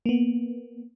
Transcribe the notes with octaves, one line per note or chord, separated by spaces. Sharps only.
A#3 B3